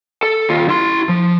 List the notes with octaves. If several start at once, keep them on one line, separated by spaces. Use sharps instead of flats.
A4
D#2 F4
E4 C6
F3